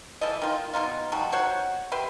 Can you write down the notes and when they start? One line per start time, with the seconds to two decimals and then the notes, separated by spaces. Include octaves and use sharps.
0.21 E3 F3 A4 D#5
0.42 D#3 F4
0.73 B2 F#3 D#4 F4
1.12 F3 G3 D#4 F#4
1.32 F#4 C5 C#5 F#5
1.92 G4 B4 E5 C6